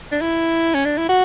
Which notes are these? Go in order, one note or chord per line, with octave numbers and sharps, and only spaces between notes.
D4
E4
C#4
D4
E4
F#4